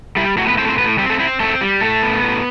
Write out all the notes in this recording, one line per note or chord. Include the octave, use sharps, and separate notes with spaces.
G3 E4
A2 F#3 F#4
B3 B4
A2 C4 C5
C4 C5
A2 B3 B4
G3 C4 G4
A3 A4
C4 E4
A3 C4 A4
G3
A2 A3 A4
B3
A2